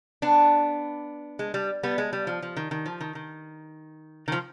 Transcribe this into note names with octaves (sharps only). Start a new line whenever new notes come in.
B3 D4
G#3
G3
G3 B3
G#3
G3
F3
F3
D#3
D#3
F3
D#3
D#3
D#3
F3